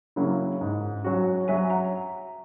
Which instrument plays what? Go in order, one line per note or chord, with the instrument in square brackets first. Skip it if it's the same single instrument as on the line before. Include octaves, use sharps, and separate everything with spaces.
[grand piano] C#3 F#3 A#3 E4
G#2
F#3 C#4 F#4
[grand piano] F#3 [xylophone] E5 G#5
[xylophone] F#5 A#5